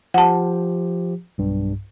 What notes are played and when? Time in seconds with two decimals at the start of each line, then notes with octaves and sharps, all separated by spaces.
0.14 F3 G4 F#5 A5
1.38 B1 G2